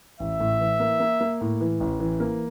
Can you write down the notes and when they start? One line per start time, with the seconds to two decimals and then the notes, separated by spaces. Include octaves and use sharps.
0.20 A1 E5
0.40 A2
0.60 E3
0.80 A#3
1.00 A#3
1.21 A#3
1.41 A2
1.61 E3
1.80 A1
2.00 E3
2.20 A#3